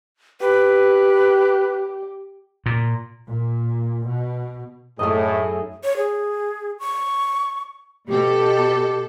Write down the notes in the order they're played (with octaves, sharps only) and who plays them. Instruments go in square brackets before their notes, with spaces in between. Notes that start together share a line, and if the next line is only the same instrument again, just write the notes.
[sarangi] G4 [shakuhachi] B4
[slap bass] A#2
[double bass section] A#2
B2
[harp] F#2 D#4 F#4 [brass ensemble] A2 [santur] A3 D#5 [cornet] G#4
[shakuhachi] C#5
G#4
C#6
[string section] B2 A4 [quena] G4